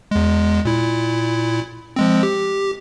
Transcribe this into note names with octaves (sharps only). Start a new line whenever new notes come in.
E2 G#3
A#2 E4
F3 G#3 C4
G4